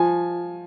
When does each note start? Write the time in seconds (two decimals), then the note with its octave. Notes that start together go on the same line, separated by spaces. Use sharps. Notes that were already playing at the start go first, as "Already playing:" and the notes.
Already playing: F3 G#5